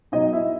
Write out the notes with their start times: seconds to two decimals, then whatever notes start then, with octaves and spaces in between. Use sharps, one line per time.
0.12 B2 F#3 D#4 D#5
0.33 E4 E5